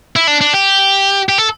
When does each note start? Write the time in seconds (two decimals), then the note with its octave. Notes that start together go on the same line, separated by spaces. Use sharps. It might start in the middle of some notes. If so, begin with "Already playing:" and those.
0.16 E4
0.27 D4
0.41 D4
0.54 G4
1.29 G4
1.38 A4